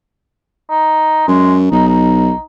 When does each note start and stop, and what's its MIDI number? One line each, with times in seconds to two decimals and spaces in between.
0.70 1.24 63
1.28 1.69 42
1.28 1.55 56
1.72 2.31 35
1.72 1.85 63
1.88 2.41 63